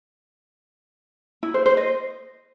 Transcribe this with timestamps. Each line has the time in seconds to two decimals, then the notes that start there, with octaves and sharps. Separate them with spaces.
1.43 E4
1.54 C5
1.66 C5
1.77 D#5